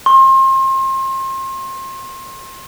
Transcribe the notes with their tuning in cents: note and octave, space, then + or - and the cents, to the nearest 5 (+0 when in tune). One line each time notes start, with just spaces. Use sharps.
C6 +35